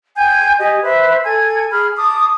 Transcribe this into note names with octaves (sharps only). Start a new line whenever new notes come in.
G5 G#5 G6
G4 D#5 G#5
B4 C5 E5
A4 G#5 G#6
G#4 B5 F6
A5 D6 D#6